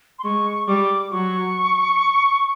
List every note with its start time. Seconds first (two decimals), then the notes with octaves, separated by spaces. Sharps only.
0.19 C6
0.24 G#3 C#6
0.67 G3 D6
1.11 F#3 C#6